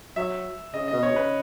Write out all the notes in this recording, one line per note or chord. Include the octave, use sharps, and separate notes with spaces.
F#3 E5
C#3 D#5
B2 D#5
C#5
C#3 B4